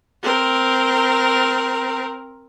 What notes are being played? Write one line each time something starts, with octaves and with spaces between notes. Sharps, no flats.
C4 A#4